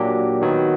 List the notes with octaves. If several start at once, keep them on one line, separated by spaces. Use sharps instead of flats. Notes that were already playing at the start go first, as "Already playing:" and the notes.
Already playing: A#2 F#3 A#3 D4 G4
D#3 F#3 B3